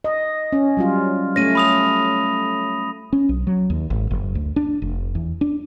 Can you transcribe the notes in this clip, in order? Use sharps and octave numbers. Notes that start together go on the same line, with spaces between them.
D#5
C#4
F#3 G3 F4
A3 C#4 C#5 A#6 D#7
B5 D#6 F7
C#4
B1
F#3
D#2
G#1
F#1
D2
D4
F1
E2
D4